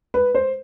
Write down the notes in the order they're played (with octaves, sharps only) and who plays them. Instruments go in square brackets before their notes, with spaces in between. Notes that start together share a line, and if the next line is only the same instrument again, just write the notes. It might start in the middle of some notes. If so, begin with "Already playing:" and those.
[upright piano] B4
C5